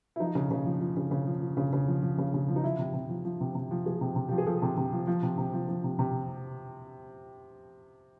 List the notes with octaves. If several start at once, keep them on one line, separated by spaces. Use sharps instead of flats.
E4
F3 D#4
C#3
C#3
F3
F3
C#3
C#3
F3
F3
C#3
C#3
F3
F3
C#3
C#3
F3
D#4
F3 E4
C3
C3
F3
F3
C3
C3
F3
F3 G#4
C3
C3
F3 G4
G#4
F3 A4
C3
C3
F3
F3
C3
C3
F3
F3
C3
C3